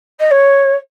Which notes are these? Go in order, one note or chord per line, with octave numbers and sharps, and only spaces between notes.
D#5
C#5